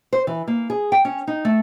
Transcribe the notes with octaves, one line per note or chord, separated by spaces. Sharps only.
C5
E3
A#3
G#4
G5
C#4
D#4
A3